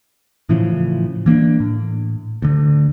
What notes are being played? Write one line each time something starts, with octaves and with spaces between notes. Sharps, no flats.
A2 C#3 E3 F3
E3 A#3 B3 D4
A2
D2 D3